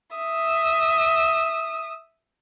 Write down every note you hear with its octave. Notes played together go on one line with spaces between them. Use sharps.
E5 D#6